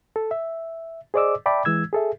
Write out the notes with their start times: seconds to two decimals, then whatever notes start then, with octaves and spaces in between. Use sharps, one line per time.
0.16 A4
0.31 E5
1.14 G#4 C5 D5 D#5 D6 E6
1.46 D5 E5 G5 A5 B5 D6
1.65 E3 G#3 E6 G#6
1.93 G#4 A4 E5